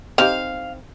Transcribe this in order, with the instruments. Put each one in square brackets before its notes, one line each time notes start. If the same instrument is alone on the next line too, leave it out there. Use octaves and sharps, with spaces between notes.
[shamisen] C4 D#4 G4 [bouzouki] F5